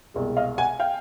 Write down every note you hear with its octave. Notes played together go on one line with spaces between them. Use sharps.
C2 B2 G#3
D#5 F5
F#5 G#5
F5 G5